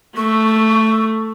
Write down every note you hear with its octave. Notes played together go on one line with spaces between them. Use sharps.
A3 C#6